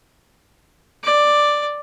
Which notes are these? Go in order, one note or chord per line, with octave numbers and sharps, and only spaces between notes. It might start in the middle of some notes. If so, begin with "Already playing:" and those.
D5